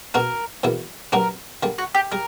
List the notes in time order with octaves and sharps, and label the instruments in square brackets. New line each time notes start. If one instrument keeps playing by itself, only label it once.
[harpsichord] B2 A#3 D4 F#4 [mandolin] A#4
[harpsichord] E2 B2 A#3 E4
[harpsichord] G2 F#3 A#3 D4 F#4 [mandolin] A#4
[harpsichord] D3 G3 A#3
[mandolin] F#4
G4
[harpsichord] G3 [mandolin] A#4